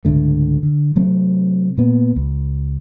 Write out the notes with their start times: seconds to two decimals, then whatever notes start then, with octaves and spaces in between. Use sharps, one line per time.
0.05 C#2 G#2 D3 A3
0.63 D3
0.96 C3 F#3 A3 C4
1.77 A#2 A#3 B3
2.16 C#2